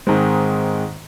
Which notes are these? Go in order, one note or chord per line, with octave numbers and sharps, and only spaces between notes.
G#2 D#3 G#3 C4